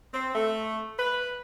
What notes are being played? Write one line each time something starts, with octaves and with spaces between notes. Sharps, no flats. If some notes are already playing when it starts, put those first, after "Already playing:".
C4
A3
B4